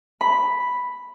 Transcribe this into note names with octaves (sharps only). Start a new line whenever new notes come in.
B5